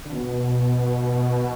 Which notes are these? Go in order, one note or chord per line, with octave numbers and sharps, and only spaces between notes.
D3
B2